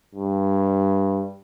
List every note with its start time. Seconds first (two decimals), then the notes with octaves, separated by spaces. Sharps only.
0.15 G2